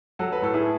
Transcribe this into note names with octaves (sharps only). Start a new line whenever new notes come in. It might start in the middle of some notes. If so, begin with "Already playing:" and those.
F#3 F#4 A4
B4
A2 A4
E4 G#4